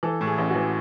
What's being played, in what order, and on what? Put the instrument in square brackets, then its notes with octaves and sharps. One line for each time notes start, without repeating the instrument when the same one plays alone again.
[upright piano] E3 A4
A2
G#4
A1
F#4
E3